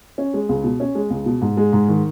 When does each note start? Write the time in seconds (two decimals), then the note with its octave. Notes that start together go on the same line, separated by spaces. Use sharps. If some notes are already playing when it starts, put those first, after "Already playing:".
0.18 C#4
0.34 G#3
0.49 C#2
0.64 B2
0.80 C#4
0.95 G#3
1.10 C#2
1.26 B2
1.41 G#2
1.57 G#3
1.73 G#2
1.88 D#3